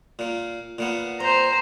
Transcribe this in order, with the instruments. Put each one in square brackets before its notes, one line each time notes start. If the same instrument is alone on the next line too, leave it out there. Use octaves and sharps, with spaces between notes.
[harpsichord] A#2 A#3
A#2 A#3 B3
[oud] C4 [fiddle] C5 A#5